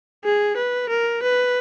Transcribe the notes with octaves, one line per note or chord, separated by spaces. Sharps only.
G#4
B4
A#4
B4